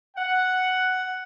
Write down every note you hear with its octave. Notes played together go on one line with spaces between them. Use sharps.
F#5